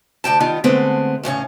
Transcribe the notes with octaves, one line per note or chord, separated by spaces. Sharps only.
D2 G2 G5 A5
D#3 G3 B3 F4
D3 G#3 A3 B3 C4
E2 A2 C#3 C#4